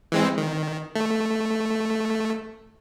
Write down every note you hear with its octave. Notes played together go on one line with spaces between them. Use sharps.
E3 G#3 C4
D#3
A3